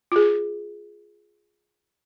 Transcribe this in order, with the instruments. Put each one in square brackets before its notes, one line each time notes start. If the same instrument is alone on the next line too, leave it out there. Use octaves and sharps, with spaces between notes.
[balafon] F4 G#4